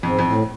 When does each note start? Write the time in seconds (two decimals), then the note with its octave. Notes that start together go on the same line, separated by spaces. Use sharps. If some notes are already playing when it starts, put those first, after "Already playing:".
0.03 F2 G#2
0.19 F2
0.27 A2